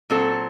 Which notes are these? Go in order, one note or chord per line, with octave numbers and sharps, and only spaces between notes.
A#2 F#3 C4 A4